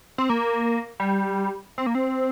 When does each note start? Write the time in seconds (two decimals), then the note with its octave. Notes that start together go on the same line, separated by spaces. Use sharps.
0.18 C4
0.30 A#3
1.00 G3
1.78 C4
1.86 A#3
1.95 C4